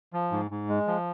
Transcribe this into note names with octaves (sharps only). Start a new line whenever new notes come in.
F3
G#2
G#2
G#3
F3